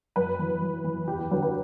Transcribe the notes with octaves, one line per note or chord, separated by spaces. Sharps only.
F#2 B4
E3
F#2
E3
E2 G4
G4
D3 F#3 B4
B4